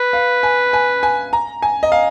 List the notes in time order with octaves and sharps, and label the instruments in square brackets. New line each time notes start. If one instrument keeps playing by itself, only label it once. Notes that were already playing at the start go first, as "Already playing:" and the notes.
Already playing: [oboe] B4
[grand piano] F5
G#5
G#5
G#5
A#5
G#5
D#5
F5